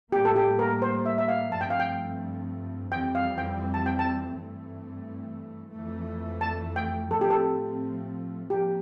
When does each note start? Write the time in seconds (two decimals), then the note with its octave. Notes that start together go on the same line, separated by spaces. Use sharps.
0.12 A2 G3 A#3 G4
0.25 A4
0.36 G4
0.59 A#4
0.82 C5
1.06 E5
1.18 E5
1.28 F5
1.52 G2 F3 A3 C4 A5
1.61 G5
1.70 F5
1.80 G5
2.92 F2 E3 G3 C4 G5
3.15 F5
3.38 G5
3.74 A5
3.86 G5
3.99 A5
4.31 G2 E3 A3 C4
5.71 F2 E3 A3
6.41 A5
6.76 G5
7.10 A2 F3 A3 C4 A4
7.21 G4
7.30 A4
8.50 F3 A#3 G4